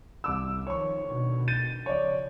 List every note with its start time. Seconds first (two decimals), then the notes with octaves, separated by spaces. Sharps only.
0.24 C2 D6 E6
0.67 D#3 F3 C#5 C#6
1.06 B2 D3 D#3
1.48 G6 A6 D#7
1.86 C#3 F3 C#5 D5